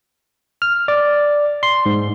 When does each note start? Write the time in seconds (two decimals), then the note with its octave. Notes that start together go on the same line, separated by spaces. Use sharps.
0.62 F6
0.88 D5
1.63 C6
1.86 G#2